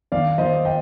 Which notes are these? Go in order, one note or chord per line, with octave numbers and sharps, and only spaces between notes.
D#3 D5 F5
D#3 C5 D#5
D#5 G5